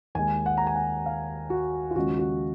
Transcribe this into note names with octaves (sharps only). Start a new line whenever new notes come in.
D#2 D#3 G#3 G#5
F#5
A#5
G#5
F#5
F5
F#4
F4
D#2 C#3 F3 G#3 F#4
F#4